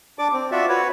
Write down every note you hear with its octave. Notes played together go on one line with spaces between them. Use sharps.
D4 D5 D6
C4
F4 F#4 D5 E5
F#4 B4 C#5